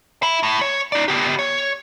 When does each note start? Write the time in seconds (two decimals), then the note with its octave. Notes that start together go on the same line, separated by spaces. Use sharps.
0.23 E5 B5
0.43 A2
0.61 C#5
0.92 D#4 D5
1.08 B3 G4
1.39 C#5